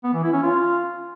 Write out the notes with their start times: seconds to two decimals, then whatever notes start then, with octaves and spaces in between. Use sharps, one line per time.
0.03 B3
0.13 E3
0.23 E4
0.33 C#4
0.43 F4